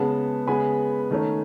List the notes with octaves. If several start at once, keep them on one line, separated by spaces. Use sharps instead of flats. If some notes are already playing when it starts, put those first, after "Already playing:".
Already playing: C#3 G#3 B3 A5
C#3 G#3 B3 G#5 B5
D#3 A3 C#4